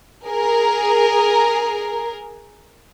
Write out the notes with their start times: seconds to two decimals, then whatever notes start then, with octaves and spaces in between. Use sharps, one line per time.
0.27 G#4 A#4